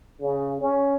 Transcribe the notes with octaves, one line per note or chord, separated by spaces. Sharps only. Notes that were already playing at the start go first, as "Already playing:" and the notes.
C#3
C#4